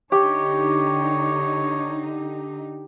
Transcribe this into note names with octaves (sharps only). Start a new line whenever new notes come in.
D3 D#4 G4 C#5